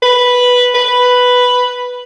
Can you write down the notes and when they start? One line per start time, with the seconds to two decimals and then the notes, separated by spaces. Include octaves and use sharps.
0.02 B4
0.75 B4